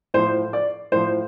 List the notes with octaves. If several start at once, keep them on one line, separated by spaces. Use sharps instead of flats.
A2 F3 C5
D5
A2 F3 C5